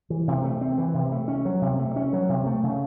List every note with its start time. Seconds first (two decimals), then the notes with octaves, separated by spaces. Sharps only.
0.10 E3
0.28 C3
0.44 A3
0.61 C4
0.78 E3
0.94 C3
1.12 A3
1.28 C#4
1.45 F#3
1.62 C3
1.79 A3
1.96 C#4
2.13 F#3
2.29 C3
2.46 A3
2.63 C#3